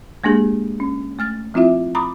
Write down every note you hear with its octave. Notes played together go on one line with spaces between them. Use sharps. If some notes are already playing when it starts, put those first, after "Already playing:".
G#3 A#3 D4 G4 G#4
C#4
A3 F6 A6
F3 C4 E4 F4 E5
A#5 B5 D6 D#6